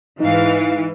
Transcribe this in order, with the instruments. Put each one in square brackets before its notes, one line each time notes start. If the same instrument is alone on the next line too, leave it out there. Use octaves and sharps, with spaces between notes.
[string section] G#2 F5 [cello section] E3 [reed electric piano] D#4